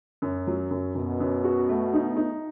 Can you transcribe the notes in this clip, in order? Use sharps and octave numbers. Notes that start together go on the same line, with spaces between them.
F#2
F#3
F#2
F#2 B2
F#2
F#4
A3
D#4
D#4